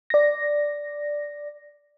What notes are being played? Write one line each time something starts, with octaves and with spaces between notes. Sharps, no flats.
D5 A#6